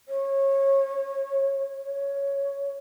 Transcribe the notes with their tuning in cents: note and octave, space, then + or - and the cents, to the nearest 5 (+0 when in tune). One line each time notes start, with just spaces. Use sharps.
C#5 -25
C#5 +10